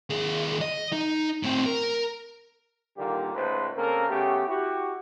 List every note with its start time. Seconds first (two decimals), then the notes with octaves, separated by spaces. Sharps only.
0.10 D#2 G#4
0.61 D#5
0.93 D#4
1.43 A2 C4
1.66 A#4
2.97 A#2 D3 D#3 G3 A#3 G4
3.34 C#2 G#2 A3 B4 C5
3.77 C#3 A#3 C4 A4 A#4
4.09 C#3 A3 B3 G4
4.48 E4 F#4 G4